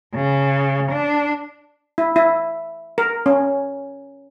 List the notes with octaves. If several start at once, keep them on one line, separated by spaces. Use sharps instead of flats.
C#3
D4
E4
E4
A#4
C#4